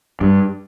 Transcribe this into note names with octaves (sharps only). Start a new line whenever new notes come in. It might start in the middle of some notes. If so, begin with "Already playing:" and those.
G2